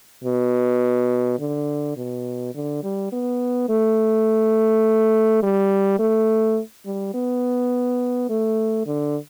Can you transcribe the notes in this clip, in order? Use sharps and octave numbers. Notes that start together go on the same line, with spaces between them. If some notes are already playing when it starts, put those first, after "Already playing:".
B2
D3
B2
D3
G3
B3
A3
G3
A3
G3
B3
A3
D3